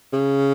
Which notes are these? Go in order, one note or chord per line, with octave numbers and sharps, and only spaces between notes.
C#3